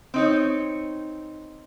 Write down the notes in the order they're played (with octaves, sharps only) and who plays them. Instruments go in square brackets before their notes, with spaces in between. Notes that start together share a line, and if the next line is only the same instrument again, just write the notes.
[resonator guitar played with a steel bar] C4 D#4 C#5